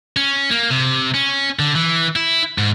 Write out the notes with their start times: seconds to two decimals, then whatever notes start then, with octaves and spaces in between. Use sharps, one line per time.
0.17 C#4
0.51 A#3
0.70 C3
1.14 C#4
1.59 D3
1.75 E3
2.16 E4
2.58 G#2